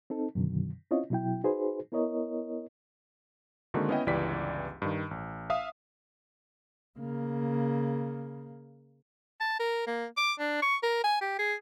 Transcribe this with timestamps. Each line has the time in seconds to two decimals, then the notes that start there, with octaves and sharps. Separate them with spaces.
0.10 C4 D#4 A4
0.35 F#2 B2 D3 D#3 F#3
0.91 C4 C#4 E4 F4 C#5 D#5
1.10 B2 F#3 E4 G5
1.44 D#4 F#4 G#4 B4 C5
1.92 B3 E4 A#4 C#5 D#5
3.74 D3 D#3 G#3 A#3 C4 F#4
3.89 B3 C#4 E4 D#5 G5
4.07 G1 C#2 E3 G4 D5 B6
4.82 G2 D#3
5.11 A1
5.50 E5 F5 D#6
6.99 C#3 A#3
9.41 A5
9.60 A#4
9.87 A#3
10.17 D6
10.39 D4
10.63 C#6
10.83 A#4
11.04 G#5
11.21 G4
11.39 G#4